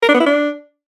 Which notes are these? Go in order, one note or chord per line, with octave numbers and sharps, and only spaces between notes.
A#4
D4
B3
E4
D4